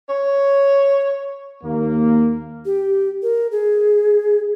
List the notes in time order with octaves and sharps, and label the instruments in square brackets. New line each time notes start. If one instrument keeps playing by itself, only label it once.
[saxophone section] C#5
[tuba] D#2 [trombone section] A#3
[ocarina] G4
A#4
G#4